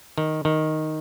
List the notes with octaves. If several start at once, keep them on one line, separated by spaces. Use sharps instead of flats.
D#3
D#3